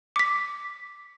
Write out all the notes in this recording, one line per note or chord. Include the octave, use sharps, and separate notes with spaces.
D6 B6